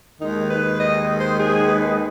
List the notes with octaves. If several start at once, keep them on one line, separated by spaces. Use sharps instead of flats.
D#2 D#3 G#3 D#4
B4
D#5
C5
G#4
B4